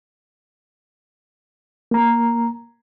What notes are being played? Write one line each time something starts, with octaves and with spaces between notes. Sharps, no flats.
A#3 A#5